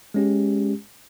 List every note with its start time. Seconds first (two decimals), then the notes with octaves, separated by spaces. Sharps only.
0.14 G#3 C#4 G4